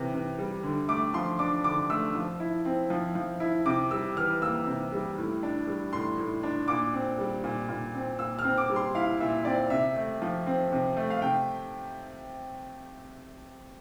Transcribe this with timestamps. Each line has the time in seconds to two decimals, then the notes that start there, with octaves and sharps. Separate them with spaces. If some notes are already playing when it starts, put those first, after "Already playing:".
Already playing: C3 E3
0.14 C3
0.39 G3
0.63 D3
0.88 A3 D6
1.14 F3 C6
1.39 D4 D6
1.64 D3 D6
1.90 A3 E6
2.15 F3
2.40 E4
2.65 C4
2.90 F3
3.15 F3
3.40 E4
3.66 C3 D6
3.91 G3 E6
4.16 E3 F6
4.41 A#3 E6
4.67 C3
4.93 G3
5.18 A2
5.43 D4
5.67 G3
5.93 A2 C6
6.18 A2
6.43 D4
6.68 A#2 D6
6.93 C4
7.19 G3
7.44 A#2
7.69 A#2
7.95 C4
8.19 A#2 E6
8.39 F6
8.44 C4
8.58 D6
8.70 G3
8.76 C6
8.95 E4 F5
9.20 A#2 E5
9.45 C4 D5
9.70 C3 E5
9.96 A3
10.22 F3
10.47 C4
10.72 C3
10.97 A3
11.10 F5
11.22 C3 G5